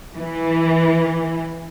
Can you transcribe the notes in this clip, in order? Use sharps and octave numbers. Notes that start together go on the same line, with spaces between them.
E3